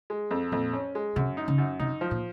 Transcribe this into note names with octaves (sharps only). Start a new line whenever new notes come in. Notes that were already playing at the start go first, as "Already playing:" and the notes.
G#3
F2
F2 A#2
C#4
G#3
F#2 C3
D#4
C#3
F#2
C3 D#4
F3
A#2